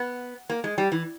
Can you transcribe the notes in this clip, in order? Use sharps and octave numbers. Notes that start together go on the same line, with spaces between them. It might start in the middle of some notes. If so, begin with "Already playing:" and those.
Already playing: B3
A#3
G#3
G3
E3